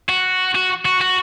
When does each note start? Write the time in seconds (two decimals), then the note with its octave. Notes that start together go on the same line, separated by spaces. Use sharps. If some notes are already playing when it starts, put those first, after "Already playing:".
0.09 F#4
0.55 F#4
0.86 F#4
1.01 F#4